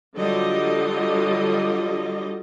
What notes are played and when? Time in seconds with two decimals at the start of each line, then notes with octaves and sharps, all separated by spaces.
0.16 D3 F#3 G3 F4 D#5